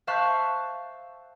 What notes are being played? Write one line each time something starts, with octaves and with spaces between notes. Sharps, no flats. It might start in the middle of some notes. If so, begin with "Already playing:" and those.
C5 E5 F5 A5 C#6 F#6